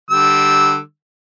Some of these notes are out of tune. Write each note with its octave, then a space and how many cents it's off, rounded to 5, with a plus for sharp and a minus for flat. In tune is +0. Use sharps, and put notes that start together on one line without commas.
D3 +20 G3 +0 E6 -10